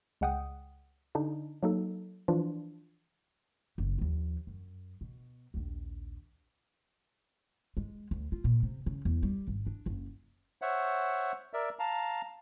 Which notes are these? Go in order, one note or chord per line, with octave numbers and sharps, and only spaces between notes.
C#2 G#3 F#5 G5 D#6
D3 D4 D#4
F#3 A#3 D#4 A4
E3 F3 D4 F4
F#1
D#2 F3
F#2
B2
A#1 D#2
G#3
D2
F4
A#2
C3
C#3
E2
G3
G#1
D4
F#1
C5 C#5 E5 F#5
A#4 D5 E5
F5 A5 A#5